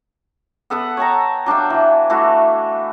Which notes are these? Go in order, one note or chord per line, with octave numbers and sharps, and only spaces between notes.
B3 A4 B4 F#5
C#5 G5 A5 A#5
F#3 D4 F5 G5
E3 F#3
E3 A3 F#4